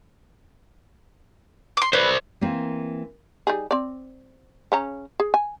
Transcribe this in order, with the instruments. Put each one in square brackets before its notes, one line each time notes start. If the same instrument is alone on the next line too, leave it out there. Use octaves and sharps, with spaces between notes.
[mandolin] C6 D6
[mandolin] B4 [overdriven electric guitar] C5 D5
[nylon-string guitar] E3 A#3 C4
[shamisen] G3 D#4 G#4
C4 D5
C#3 C#4 A#5
G#4
G#5